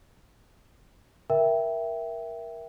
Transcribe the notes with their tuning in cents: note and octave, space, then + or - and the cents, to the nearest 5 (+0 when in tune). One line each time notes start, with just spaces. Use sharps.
A#4 +15 E5 +0 G5 +0